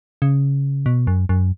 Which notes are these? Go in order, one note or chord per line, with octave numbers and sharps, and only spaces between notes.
C#3
B2
F#2
F#2